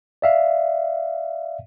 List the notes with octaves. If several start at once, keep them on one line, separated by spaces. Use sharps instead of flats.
D5 E5 F5